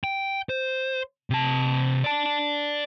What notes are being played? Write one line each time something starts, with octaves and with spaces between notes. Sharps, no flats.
G5
C5
C3 A5
D5 A5